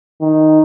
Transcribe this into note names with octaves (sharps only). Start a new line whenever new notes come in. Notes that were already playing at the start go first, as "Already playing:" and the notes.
D#3